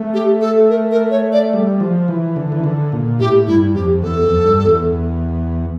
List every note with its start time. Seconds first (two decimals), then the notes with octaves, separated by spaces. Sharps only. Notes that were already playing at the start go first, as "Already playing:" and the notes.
Already playing: A3
0.14 G4
0.41 A4
0.69 A#4
0.91 A#4
1.11 C#5
1.32 D5
1.53 G3
1.80 F3
2.08 E3
2.36 D3
2.52 E3
2.64 D3
2.92 A#2
3.19 A2 G4
3.47 G2 E4
3.75 F2 G4
4.03 E2 A4
4.23 F2
4.44 G2
4.66 E2